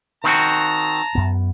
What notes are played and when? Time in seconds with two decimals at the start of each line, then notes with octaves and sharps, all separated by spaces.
0.24 D#3 C4 F#4 A5 A#5
1.15 F#2 B3